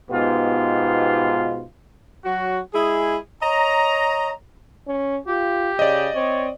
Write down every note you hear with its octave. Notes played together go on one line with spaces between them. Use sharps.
G#2 B2 B3 D#4 F4 G4
F#3 F#4
G#3 E4 G#4
C#5 D#5 A#5
C#4
F4 G4
C#3 D5 D#5
C4 C#5